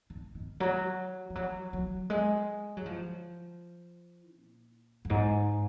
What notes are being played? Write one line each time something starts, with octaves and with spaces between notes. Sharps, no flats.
D#3
D#3
F#3
F3
F#3
F#3
G#3
F#3
F3
A#2
F#2
G#2